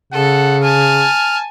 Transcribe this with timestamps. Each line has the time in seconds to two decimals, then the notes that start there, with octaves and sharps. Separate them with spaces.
0.13 C#3 A4 F#5
0.63 G#5 A5 F6